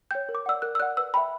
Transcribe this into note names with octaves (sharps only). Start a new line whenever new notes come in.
C#5 G5 G6
A#4
D6
D5 F#5 E6
A#4 F#6
E6
D5 F#5 F#6
B4 E6
E5 G5 B5